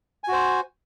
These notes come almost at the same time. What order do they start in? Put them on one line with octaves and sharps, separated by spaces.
G#5 F#4 C5